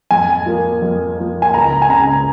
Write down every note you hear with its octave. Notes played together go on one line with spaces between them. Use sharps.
F2 G#5
F3 A#3
F2
F3 A#3
G#5
C#2 A#5
G#5
C#3 G#3 A#5